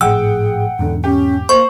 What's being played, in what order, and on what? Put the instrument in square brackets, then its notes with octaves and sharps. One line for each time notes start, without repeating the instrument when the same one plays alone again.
[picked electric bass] G#1 A2 F3 [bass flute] G#4 [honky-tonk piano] F#5 G5 [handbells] E6
[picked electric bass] E1 E2 G#2 [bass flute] D3
[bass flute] C#4 [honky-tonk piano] G4
[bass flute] A#3 [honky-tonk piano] C5 [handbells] C#6